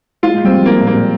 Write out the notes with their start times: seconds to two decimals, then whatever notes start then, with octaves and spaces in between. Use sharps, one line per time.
0.23 G#3 F4
0.34 G#3
0.44 G3 C4
0.55 F3
0.66 A#3
0.80 A#2
0.87 A#3
0.94 A#2